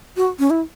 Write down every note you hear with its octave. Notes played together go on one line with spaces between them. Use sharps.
F#4
C#4
E4